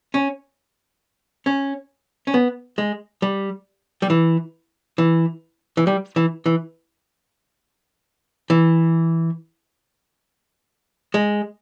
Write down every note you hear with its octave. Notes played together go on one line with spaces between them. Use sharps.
C#4
C#4
C#4
B3
G#3
G3
G3
E3
E3
E3
G3
E3
E3
E3
G#3